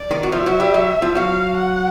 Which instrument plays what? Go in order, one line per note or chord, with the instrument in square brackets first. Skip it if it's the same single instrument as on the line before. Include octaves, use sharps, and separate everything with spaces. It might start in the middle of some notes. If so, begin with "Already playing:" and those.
Already playing: [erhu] D5
[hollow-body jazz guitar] D#3 D#4
F#4
[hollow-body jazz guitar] F3 F4 [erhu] E5
[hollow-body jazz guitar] F#3 F#4
G3 G4
F#3 F#4
F3 F4
[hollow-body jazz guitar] F#3 F#4 [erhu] F5
[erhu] F#5